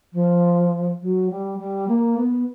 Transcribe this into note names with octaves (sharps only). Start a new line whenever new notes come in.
F3
F#3
G3
G3
A#3
B3